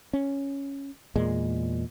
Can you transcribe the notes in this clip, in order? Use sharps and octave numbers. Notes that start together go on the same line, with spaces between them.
C#4
E2 A#2 G#3